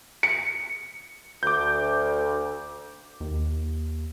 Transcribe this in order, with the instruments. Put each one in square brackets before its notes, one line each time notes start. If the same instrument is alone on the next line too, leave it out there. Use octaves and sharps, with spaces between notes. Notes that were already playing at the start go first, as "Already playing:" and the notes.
[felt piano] C#7
[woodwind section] D2 [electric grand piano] D6 G6
[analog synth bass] D#2